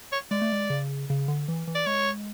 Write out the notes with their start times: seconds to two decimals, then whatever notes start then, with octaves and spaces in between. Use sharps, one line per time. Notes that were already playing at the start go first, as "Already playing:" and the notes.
0.12 C#5
0.31 G#3 D5
0.42 A3
0.52 G#3
0.70 C#3
1.10 C#3
1.28 D3
1.48 E3
1.67 E3
1.75 D5
1.87 G#3 C#5